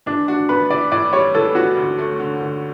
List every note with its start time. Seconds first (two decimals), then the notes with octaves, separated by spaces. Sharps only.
0.06 E3 D4
0.28 D4 F#4
0.49 B3 B4
0.70 E3 D5
0.92 A2 D5
1.13 G3 C#5
1.35 E3 A4
1.55 B3 F#4
1.77 D2
1.98 A3
2.19 D3
2.40 D2